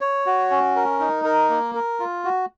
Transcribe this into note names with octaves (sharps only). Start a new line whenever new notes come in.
C#5
F#4
C#4
A#4
D#4
A#4
A#3
A#4
F4
F#4